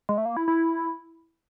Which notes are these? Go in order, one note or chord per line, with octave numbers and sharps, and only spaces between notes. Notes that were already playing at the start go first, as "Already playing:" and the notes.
G#3
A3
A#3
E4
E4